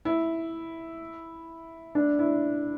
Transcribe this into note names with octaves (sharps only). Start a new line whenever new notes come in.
E4
D4
E4